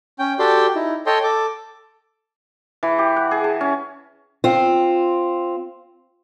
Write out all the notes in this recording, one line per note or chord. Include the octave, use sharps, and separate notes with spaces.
C#4 G5
F#4 G4 A4 D5 G5 C6
D#4 E4
A4 C#5 D#5 G5 C6
A4 D6
E3
G4
F#5
G#4
A5
C#4
C4 F4